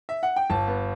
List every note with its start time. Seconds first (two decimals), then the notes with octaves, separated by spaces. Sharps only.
0.09 E5
0.23 F#5
0.36 G5
0.50 G1 A5
0.68 B3